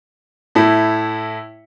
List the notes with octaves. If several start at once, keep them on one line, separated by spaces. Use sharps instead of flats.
A2 E4